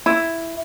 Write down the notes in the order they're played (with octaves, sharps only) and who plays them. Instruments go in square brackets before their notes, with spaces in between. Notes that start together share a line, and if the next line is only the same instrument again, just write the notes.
[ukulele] E4